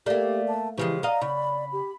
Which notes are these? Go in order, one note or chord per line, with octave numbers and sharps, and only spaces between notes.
A3 A#3 G4 D5
A5
C#3 E3 F3 G#3 G4
D5 D#5 F5 A#5
C#3 B5
G4